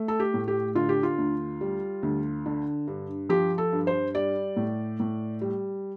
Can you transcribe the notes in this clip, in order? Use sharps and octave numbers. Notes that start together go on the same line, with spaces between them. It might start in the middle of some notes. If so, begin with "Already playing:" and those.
Already playing: A3
A4
G4
A2
G4
D3 F4
G4
F4
D2
G3
D2
D3
G2
F3 G4
A4
G2
C5
G3 D5
A2
A2
G3